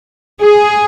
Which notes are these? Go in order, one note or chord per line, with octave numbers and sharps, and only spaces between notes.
G#4